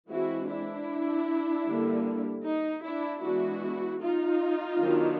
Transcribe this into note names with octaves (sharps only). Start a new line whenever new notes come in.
E3 G#3 C4 E4 F#4
D4 E4
D3 G3 A#3
D#4
D4 E4
E3 G#3 B3 D4 E4 F#4
D#4 F4
D#3 F#3 B3 D4